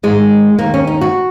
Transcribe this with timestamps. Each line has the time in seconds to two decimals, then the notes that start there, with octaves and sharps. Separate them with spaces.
0.03 G#2 D#3 G#3
0.59 D#2 D#3 A#3
0.74 C#4
0.87 D#4
1.01 F#4